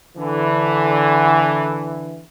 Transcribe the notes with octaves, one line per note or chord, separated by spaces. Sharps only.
D3 E3